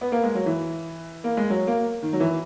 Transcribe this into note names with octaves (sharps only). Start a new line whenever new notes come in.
B3
A#3
G#3
F#3
E3
A#3
G#3
F#3
A#3
D#3
F#3
E3